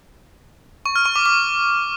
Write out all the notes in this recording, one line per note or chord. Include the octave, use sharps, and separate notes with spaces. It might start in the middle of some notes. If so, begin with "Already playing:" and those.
C#6
F6
C#6
D6
D6